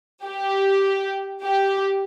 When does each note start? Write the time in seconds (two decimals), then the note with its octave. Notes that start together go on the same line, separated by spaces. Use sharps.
0.24 G4
1.43 G4